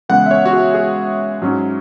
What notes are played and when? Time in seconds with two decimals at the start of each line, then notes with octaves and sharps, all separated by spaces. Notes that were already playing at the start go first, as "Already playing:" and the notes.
0.09 C#3 E3 G#3 B3 F#5
0.26 E5
0.31 C#5
0.46 F#4
0.53 G#4
0.74 G#4
1.42 G#2 F#3 C#4